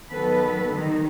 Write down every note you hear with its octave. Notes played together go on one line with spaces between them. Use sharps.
D#3 F#3 B3 A4 B4
D#3 G3 D#4